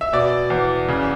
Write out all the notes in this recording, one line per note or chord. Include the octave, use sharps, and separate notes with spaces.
E5
B2 D5
E2
C#3